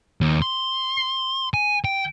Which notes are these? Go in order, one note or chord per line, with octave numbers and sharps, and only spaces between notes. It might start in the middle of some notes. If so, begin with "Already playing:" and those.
D#2
C6
G#5
G5